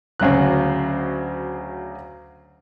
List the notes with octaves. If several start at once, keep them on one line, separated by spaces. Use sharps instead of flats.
D2 C#3 F#3 F#6